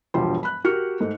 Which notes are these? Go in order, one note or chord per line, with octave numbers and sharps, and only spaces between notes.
E1 G2 F3 G3 C6
B5 F#6
F#4 G4 A#4 F6 C#7
G#2 A3